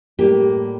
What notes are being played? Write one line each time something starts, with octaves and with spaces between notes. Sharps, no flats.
A2 G3 A#3 G4